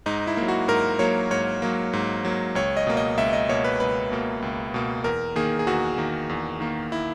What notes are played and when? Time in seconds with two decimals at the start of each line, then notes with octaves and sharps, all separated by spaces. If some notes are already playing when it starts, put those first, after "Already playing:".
0.06 G#2 D#4
0.27 E4
0.37 F#3 A#3
0.48 F#4
0.68 G#2 A#4
0.99 F#3 A#3 C#5
1.31 G#2 C#5
1.62 F#3 A#3
1.93 G#2
2.25 F#3 A#3
2.55 C#2 C#5
2.77 D#5
2.87 B2 A#3
2.97 D#5
3.17 C#2 E5
3.33 D#5
3.49 B2 A#3 C#5
3.64 B4
3.80 C#2 B4
4.11 B2 A#3
4.42 C#2
4.74 B2 A#3
5.04 E2 A#4
5.36 D#3 A#3 G#4
5.59 G#4
5.67 E2 F#4
5.98 D#3 A#3
6.29 E2
6.60 D#3 A#3
6.92 E4